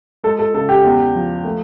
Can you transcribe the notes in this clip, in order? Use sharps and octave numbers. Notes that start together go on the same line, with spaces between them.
G#3 A4
A4
C#3 A4
G4
E2
F3
A3